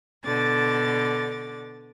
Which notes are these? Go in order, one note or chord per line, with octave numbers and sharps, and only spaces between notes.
B2 D3 D6 A6